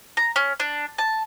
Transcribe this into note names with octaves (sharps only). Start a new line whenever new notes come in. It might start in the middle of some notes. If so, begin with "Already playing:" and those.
A#5
C#4
D4
A5